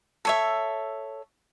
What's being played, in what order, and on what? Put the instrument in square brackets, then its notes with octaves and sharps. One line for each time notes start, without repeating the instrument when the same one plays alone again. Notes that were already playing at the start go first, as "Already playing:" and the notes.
[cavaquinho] A4 C#5 E5